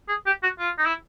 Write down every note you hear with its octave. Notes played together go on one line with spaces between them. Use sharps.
G#4
G4
F#4
F4
D#4
E4